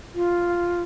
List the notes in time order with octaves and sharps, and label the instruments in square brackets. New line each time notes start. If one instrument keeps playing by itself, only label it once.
[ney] F4